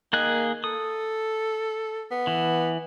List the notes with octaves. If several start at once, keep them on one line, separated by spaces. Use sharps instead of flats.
D#3 A#3 G#4 F#6
A4 D#6
B3
E3